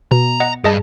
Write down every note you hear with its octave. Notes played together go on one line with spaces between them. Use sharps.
B2 A#5
D#5 F#5
G2 G#4 D#5 A5